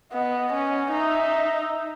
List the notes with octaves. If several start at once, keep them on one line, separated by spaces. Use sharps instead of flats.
B3 D#5
C#4
D#4 E5